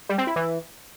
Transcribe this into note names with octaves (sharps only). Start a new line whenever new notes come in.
G3
C4
E4
E3